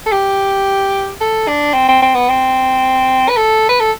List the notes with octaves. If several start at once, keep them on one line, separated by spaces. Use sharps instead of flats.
A4
G4
A4
D4
C4
C4
C4
B3
C4
B4
A4
B4
A4